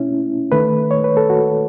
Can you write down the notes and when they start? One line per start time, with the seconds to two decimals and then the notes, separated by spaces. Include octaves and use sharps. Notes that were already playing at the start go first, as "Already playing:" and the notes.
Already playing: B2 A3 C#4 E4
0.52 D#3 A3 B4
0.91 C#5
1.04 B4
1.17 A4
1.30 F#4